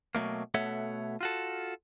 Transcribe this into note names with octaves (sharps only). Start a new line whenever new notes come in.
B2 F#3 A3 A#3
B2 A3 A4 C#5 E5 F#5
F4 F#4 A4